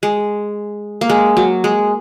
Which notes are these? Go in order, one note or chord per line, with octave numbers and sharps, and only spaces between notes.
G#3
A#3
G#3
F#3
G#3